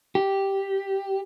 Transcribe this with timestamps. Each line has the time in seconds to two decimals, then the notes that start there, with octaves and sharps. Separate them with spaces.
0.15 G4